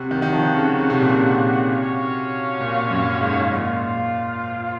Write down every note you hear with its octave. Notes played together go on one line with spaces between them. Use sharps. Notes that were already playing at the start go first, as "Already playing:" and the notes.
Already playing: C3 F#4 C#5 F#5
D#3
D#3
F3
C#3
C#3
C3
A#2
C3
C#4 F#4 C#5 F5
A#2
F#2
G#2
A#2 F4 C5 F5